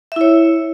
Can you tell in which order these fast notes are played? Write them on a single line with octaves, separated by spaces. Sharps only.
E5 E4 C#5